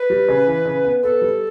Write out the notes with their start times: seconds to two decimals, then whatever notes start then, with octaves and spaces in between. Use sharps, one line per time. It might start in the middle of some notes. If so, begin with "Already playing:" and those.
Already playing: B4
0.10 G3
0.29 C#3
0.47 E3
0.65 C#3
0.85 B3
1.03 B3 A4
1.22 G3